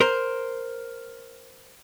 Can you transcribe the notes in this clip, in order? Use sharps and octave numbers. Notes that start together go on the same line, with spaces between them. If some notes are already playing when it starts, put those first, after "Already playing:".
A#4 C5